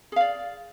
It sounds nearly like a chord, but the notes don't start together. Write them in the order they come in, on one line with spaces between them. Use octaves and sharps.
G#4 F5 D5